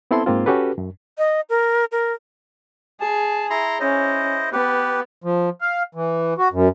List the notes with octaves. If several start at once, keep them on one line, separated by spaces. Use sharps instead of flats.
B3 C4 E4 A4 A5 C6
G#2 A#3 C4 F4
C#4 F#4 G4 A4 B4
F#2
D#5
A#4
A#4
G#4 A5
E4 A#5 C6
C#4 E4 C5 D#5
B3 G4 B4
F3
F5
E3
F#4
F#2